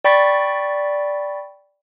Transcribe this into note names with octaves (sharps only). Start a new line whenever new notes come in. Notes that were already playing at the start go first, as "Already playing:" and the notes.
D5 G5 B5 C#6 A6 B6